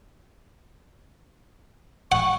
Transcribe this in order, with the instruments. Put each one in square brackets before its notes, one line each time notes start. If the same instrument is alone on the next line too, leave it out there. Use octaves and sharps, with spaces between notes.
[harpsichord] F#5 [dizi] C#6